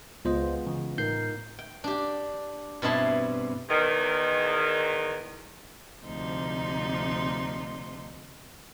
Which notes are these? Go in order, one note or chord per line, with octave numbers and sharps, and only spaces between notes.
C#2 G#3 B3 F4 C5 D#5
C#3 E3
A2 D#4 A#4 G6 C7
G5
D4 G4
G2 B2 C4 E4 A5 C6
E2 D#3
D2 C3 F3 D#4 C6